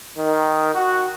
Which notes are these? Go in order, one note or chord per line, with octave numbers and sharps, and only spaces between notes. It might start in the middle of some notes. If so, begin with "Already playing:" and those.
D#3
F#4